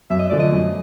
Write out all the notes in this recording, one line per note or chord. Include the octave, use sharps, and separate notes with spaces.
F#2 E5
D#5
D3 F3 A3 D5
D#5
F#2